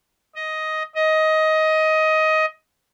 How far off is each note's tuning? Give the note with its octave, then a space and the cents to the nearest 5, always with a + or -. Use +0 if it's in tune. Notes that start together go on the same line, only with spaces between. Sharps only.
D#5 +10
D#5 +15